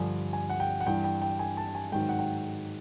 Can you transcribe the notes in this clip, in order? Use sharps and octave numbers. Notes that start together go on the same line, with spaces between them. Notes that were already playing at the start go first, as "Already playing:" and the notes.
Already playing: G2 D3 F3 G#5
G#5
F#5
G5
F#5
G2 E3 G5
G5
G5
G#5
A5
G#5
G#2 D#3 F#3 G5
F#5
G5